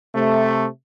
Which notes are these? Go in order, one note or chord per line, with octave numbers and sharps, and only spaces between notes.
C3 A3